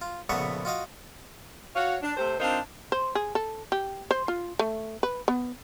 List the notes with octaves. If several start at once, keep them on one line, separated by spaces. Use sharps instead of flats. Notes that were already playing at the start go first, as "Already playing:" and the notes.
F4
A#1 C#3 A3 B3 C#5 F#5
F4 F#4 D#5 F5
F#4 C#5 F5
D4
C3 A3 C4 C5
C4 D4 D#4 F4 A#4 C5
C5
G#4
A4
G4
C5
F4
A3
B4
B3